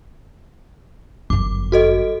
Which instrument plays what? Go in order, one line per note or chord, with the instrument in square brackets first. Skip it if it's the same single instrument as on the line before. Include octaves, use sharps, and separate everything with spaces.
[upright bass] G1 F#2 [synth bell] D6
[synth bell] F#4 A4 D#5